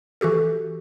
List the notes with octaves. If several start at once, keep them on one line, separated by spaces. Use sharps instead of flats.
E3 F#4 G4 A4